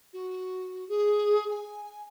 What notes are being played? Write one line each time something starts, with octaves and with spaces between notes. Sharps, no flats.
F#4
G#4
G#5